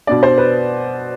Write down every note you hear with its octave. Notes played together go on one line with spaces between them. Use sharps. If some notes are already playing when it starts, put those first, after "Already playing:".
B2 B3 D4 D5
C5
B4